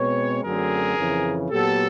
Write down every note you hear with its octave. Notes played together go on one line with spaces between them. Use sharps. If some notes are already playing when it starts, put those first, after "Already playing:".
Already playing: B2 G#3 C4 B4 C#5
F#2 D3 F#3 A3 C4 G#4 A#4
F2 C#3 E3
A#2 F#3 B3 G4 A4